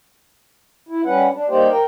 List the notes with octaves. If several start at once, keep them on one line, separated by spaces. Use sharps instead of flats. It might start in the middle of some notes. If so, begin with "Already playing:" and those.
E4
G3 C#4 B4 F#5
D4
G3 A#3 D#4 G4 C5 D5
A#4 G5